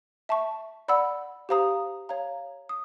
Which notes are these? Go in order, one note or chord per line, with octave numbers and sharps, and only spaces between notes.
E5 A5 C#6
D5 F#5 B5 E6
G4 C5 F5 A#5 D#6
C#5 F5 A#5
D#6